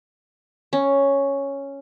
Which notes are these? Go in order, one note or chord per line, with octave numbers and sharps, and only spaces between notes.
C#4